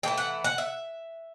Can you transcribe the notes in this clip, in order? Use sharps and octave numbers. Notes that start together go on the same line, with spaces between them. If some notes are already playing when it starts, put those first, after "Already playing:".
E3 A3 E4 G5
F#5
F#5
E5